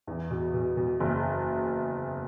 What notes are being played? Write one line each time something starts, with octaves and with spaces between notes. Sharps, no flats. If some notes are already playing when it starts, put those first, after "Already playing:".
E2
B2
B2
B2
F#1